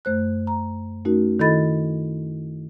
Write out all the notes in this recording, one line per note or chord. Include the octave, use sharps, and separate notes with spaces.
F#2 A3 C5 F#6
A#5
A3 C#4 D#4 F#4 A#4
D#3 E4 A4 D#5 B5 A6